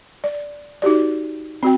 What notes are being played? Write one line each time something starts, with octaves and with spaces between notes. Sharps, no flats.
D5
D#4 F#4 G4 D5
C4 F#4 G5